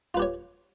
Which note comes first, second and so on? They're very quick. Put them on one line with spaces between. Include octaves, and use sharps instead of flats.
F4 B4 G4 C#5